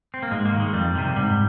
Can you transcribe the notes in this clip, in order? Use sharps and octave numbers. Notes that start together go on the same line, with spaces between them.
C4
A#3
G#2 G#3
A#3
D#3
G#3
F2 G3
C3 D#3
G#2 G3